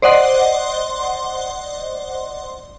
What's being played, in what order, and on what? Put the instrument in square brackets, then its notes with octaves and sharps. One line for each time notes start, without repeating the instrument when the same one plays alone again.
[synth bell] C5 D5 D#5 F#5 C6